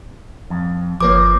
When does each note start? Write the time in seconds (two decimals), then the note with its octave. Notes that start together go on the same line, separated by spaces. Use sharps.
0.50 F2
1.01 G1 F3 A#3 B4 C#5 D6